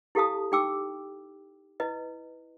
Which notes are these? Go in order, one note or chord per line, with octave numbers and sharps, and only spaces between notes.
E4 G4 A4 F5 A5 D#6
D#4 G4 G5 D6 E6
E4 B4 D#5